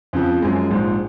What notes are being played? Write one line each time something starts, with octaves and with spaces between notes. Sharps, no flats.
F2 C#3 F3
F#2 F3 G#3
A#1 G#2 F3